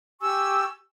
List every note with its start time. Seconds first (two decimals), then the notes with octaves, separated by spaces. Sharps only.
0.21 G4 G#5 C#6 E6